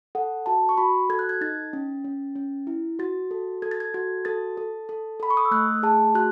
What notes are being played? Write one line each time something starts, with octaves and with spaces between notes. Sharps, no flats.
A4 F#5
F#4 A5
C#6
F#4 B5
A4 G#6
F#6
G#6
D#4 A6
C#4
C#4
C#4
E4
F#4 A6
A4
A4 G#6
A6
G#6
F#4 G#6
A4 A6
A4
A4
A4 B5
C#6
D#6
E6
A3 F#6
G#4 A5
F#4 F#6